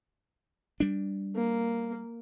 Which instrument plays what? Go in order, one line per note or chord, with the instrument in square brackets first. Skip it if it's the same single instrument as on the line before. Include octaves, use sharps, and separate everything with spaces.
[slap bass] G3 D4
[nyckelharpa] A#3